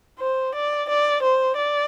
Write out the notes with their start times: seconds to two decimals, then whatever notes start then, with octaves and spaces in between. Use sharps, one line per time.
0.19 C5
0.55 D5
0.89 D5
1.22 C5
1.57 D5